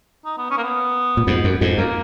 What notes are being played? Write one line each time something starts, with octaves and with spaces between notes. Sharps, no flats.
D#4
B3
C#4
A#3
B3
A#2
F2 G#2
F#2
F2 G#2
F#2 A#3